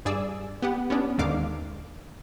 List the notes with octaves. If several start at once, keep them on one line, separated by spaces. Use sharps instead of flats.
G2 G#4 D5 E6
B3 G4 F#5
B3 C#4 D4
D#2 G#2 D3 D#3 F5 D6